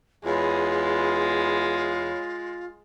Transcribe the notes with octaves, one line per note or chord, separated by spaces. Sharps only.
E2 G#3 F4 C#5 B5